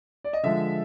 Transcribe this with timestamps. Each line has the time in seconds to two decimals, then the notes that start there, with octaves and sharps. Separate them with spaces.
0.24 D5
0.33 D#5
0.43 D3 F3 G#3 E5